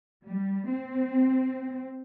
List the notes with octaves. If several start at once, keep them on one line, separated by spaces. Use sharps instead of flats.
G3
C4